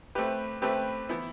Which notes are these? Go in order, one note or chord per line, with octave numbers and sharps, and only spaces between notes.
A3 C4 G4 B4
A3 C4 G4 B4
E3 B3 E4